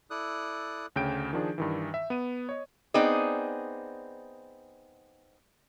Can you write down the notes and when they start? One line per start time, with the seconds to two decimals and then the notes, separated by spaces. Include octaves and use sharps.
0.10 E4 A4 D5 D#6 F#6
0.96 D2 C#3 G5 G6 D7
1.33 D#3 F3 D4 G#4
1.58 G2 D#3 E3
1.94 E5
2.10 B3 D#7
2.49 C#5 D#5
2.94 B3 C4 D#4 G#4 D5